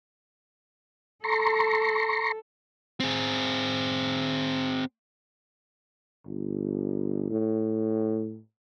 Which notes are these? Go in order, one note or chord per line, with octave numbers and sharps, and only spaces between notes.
A4 A#5 C6 C#6
C4 G#4
G1
A2